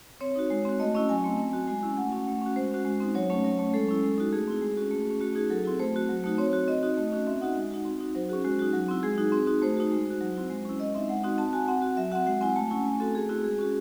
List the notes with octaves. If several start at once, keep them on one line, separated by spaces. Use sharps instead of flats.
C4 C#5
D#4 F#4
G#3
C4 F#4
A3 D#5
C#4 E4 D#5
F#3 G#5
A3 C4
C4
F#4
G#3 G#5
C#4 E4
A3 F#5
C#4 F#4
A3
C#4 F#4
G#3 C5
C#4 F#4
G#3
C4 D#4
F#3 C#5
A3 C#4
F#3
A3 C#4
G#3 A4
C#4 E4
G#3
D#4 F#4
A3 G#4
C4 E4
G#3
C#4 F#4
A3
C#4 F#4
A3 F#4
D#4 F#4 G#4
F#3 A4
C4 E4
A3 C5
C4 F#4
F#3
A3 D#4 F#4
C4 C#5
F#4
C4 D#5
D#4 F#4
A3
C#4 F#4
C4 E5
D#4 F#4 F#5
G#3
D#4 F#4
C4
D#4 F#4
F#3 C5
C#4 F#4 G#4
G#3 F#4
D#4 F#4
F#3
C4 E4
G#3 G#4
D#4 F#4
C4
D#4 F#4
A3 C5
D#4 F#4
G#3
D#4 F#4
F#3
C4 E4
G#3
C#4 E4
G#3 D#5
C4 D#4 E5
G#3 F#5
C4 D#4 F#4
C4 A5
F#4 G#5
C4 F#5
F#4
F#3 E5
C4 F#4 F#5
G#3 F#5
C4 E4 G#5
A3 A5
C#4 E4 G#5
A3 G#5
C4 F#4 A4
A3 G#4
C4 E4 F#4
G#3 G#4
C#4 F#4